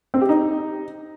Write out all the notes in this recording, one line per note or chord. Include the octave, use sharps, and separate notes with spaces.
C4
G4
D#4